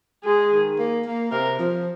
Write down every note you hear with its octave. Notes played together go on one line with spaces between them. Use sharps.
G#3 G#4
D#3
A#3
A#3
C3 A#4
F3